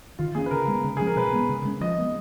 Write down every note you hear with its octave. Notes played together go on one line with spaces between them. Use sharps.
D#3 F4
A#3 C#4 G#4
B4
C#3 A#4
G#3 B3
C#3
F3 G#3 C#4 G#4
A#4
B2 B4
G#3 B3
C#3
G#3 C#4
F3 D#5
G#3 B3